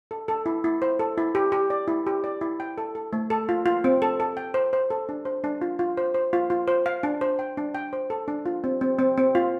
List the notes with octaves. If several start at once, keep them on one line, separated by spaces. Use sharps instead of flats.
A4
A4
E4
E4
C5
A4
E4
G4
G4
D5
E4
G4
D5
E4
G5
A4
A4
A3
A4
F4
F4
C4
A4
A4
G5
C5
C5
A4
D4
C5
D4
F4
F4
C5
C5
F4
F4
C5
F5
D4
C5
G5
D4
G5
C5
A4
D4
F4
C4
C4
C4
C4
F4